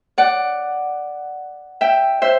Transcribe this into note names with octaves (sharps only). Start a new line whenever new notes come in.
D5 F#5
E5 G5
C5 E5